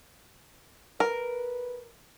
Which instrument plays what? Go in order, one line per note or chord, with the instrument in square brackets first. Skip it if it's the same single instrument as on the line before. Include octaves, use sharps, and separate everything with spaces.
[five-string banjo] A#4 [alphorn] B4